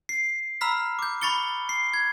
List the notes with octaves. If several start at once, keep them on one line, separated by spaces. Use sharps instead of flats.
C7
A#5 B5 E6 F6 B6
D6 G6
B5 C#6 A6 C#7 G7
C7
G#6